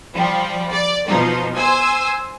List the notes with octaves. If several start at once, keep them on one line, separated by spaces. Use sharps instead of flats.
F3 G3
D5
B2 F3 D#4
C5 G#5 E6